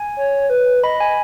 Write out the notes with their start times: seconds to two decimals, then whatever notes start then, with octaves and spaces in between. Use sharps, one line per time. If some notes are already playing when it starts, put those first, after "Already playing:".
Already playing: G#5
0.16 C#5
0.50 B4
0.83 D#5 B5
1.00 G#5